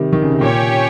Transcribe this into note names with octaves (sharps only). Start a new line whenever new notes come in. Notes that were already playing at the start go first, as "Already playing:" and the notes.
Already playing: C3 D#3 G3
D#3
C#3
C3
A#2 C#4 G4 C#5